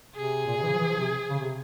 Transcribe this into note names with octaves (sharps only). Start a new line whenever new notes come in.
C3 G#4
A#2
C3
E3
C#3
F3
E3
F3
C3
C#3
C3